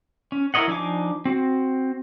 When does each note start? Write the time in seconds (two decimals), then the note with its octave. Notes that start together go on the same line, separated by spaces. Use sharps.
0.32 C#4
0.54 E4 A#4 C#5 D#5 F#5
0.68 F3 D4 D#4 G#5 D6
1.25 C4 F#4